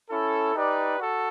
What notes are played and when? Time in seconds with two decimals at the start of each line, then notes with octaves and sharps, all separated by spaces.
0.10 C#4 E4 A4
0.54 D#4 G4 B4 D5
0.98 F#4 A4